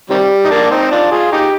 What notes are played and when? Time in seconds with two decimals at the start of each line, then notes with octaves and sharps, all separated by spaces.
0.10 C3 D#3 G3
0.44 D#4
0.50 A#3 D4
0.71 C4 D#4
0.91 D4 F4
1.11 F4 G#4
1.32 D#4 G4